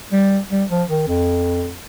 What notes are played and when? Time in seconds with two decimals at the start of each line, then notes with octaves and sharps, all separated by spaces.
0.12 G3
0.51 G3
0.70 F3
0.89 D#3
1.07 F2